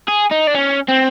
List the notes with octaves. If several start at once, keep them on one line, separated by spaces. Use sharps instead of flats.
G#4
D#4
D4
C#4
C4